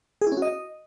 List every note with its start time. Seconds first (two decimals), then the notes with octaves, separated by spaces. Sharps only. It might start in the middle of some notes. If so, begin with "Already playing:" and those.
0.21 G#4
0.27 E4
0.32 C#4
0.37 F#4
0.42 D#5